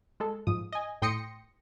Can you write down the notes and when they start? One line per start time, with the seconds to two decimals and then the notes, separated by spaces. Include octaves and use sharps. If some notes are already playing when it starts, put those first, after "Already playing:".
0.20 G#3 A4
0.47 G#2 F3 D#6
0.72 D#5 G#5
1.02 A2 G5 C6 D#6 A#6 C#7